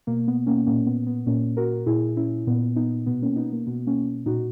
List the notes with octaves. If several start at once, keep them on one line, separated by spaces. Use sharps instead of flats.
B2 A#3
B3
A#3 C#4
A#2 A#3 C#4
B3
B3
A#2 A#3 C#4
F#4 A#4
A#2 E4 G#4
C#4 E4
A#2 B3
B3 D#4
B2 B3
A#3 C#4
B3 D#4
A#3
B2 B3
A#3 C#4
A#2 D#4 F#4